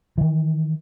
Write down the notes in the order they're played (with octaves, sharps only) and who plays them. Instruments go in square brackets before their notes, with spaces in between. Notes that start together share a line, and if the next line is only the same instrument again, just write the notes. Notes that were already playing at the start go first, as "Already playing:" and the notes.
[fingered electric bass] D#3 E3